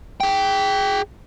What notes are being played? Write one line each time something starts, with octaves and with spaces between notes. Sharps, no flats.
G#4 G5